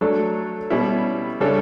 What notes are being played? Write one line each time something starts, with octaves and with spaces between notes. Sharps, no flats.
F#3 A3 D4 A4
B2 G3 C#4 E4
C#3 G3 D4 A4 C#5